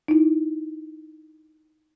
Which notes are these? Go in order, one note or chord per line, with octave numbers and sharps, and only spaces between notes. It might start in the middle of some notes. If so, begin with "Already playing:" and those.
D#4 E4